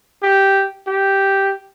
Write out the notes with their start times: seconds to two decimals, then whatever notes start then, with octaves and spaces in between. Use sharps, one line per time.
0.23 G4
0.87 G4